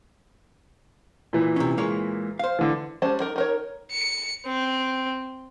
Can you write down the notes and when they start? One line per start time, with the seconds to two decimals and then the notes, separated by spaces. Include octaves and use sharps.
1.33 A#2 E3
1.56 C3 C#4
1.78 G#3 A#3 C#5
2.39 C5 F5
2.59 D3 E3
3.02 G3 G#3 C#4 C5 A5
3.20 D#4 A#4
3.36 D#4 A#4 C#5
3.91 C#7
4.46 C4